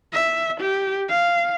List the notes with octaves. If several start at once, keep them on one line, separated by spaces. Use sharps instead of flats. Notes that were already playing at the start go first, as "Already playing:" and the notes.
E5
G4
F5